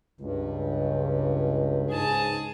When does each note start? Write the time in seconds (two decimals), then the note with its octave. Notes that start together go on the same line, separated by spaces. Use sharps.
0.21 C#2 G2
1.90 C#2 G#2 G#4 A5